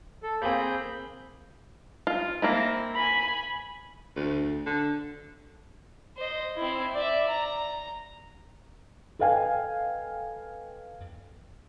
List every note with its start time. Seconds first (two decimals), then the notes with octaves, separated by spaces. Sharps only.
0.23 A4
0.42 A#3 C4 G#4 B5 G6
2.07 F4
2.42 A#3 C4 E4
2.95 G#5 B5
4.16 D2
4.66 D3
6.17 C5 D#5
6.56 C4 E4
6.94 D5 E5
7.29 A#5
9.19 A4 B4 D#5 F5 G5 G#5